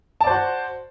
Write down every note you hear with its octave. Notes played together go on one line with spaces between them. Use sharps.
F#4 C5 D5 A5